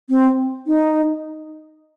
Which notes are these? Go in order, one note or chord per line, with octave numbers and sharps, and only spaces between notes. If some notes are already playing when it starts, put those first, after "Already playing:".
C4
D#4